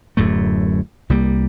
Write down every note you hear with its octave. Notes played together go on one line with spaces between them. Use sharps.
D1 F#2 A2 A3
C2 G3 A#3